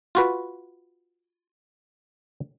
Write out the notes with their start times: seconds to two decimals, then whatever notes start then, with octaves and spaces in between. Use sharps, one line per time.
0.15 F4 F#4 B4